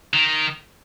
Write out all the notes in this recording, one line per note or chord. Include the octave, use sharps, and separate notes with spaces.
D#3